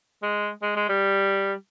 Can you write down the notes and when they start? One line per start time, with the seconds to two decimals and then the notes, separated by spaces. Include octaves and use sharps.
0.23 G#3
0.62 G#3
0.76 G#3
0.89 G3